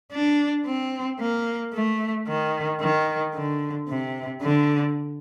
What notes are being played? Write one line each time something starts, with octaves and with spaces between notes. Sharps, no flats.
D4
C4
A#3
A3
D#3
D#3
D3
C3
D3